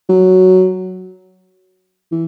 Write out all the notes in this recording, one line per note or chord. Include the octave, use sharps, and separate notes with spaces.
F#3
E3